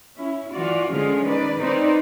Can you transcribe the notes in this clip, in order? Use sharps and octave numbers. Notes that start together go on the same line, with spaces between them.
C#4 E4
E3 F4 F#4 D5
D3 F3 G#3 C#4 F4 G#4
D#3 B4 D5
C4 D#4 B4 C5 D5